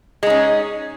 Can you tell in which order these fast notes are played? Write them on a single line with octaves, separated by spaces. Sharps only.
G#3 D#4 C#4